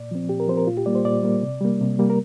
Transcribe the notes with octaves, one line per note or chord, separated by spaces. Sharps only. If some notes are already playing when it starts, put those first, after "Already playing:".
Already playing: A#2 D5
F3 C4
A#2 G4
A#4
F3 C4 C5
A#4
A#2 F4
G4
G3 A#3 D5
C5
A#2 D5
G3 A#3
C3
G3 A#3
C3
G3 A#3
A#4